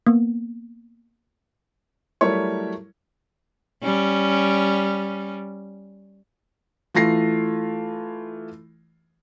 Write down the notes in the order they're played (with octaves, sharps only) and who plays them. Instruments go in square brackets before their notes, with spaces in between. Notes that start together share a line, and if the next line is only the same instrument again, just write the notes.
[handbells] A#3 B3
[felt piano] F#3 G3 A3 E4 A#4 C#5
[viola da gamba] G3 C#4
[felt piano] E3 A3 F4 A#6 C7